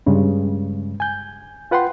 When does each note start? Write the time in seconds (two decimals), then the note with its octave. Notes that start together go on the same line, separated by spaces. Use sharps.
0.06 G2 C#3 G#3
1.00 G#5 G6
1.71 F4 B4 F#5 G5 C6